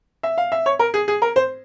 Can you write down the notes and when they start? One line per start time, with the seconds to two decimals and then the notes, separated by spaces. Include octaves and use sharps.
0.23 E5
0.38 F5
0.52 E5
0.66 C#5
0.79 A#4
0.94 G#4
1.08 G#4
1.22 A#4
1.36 C5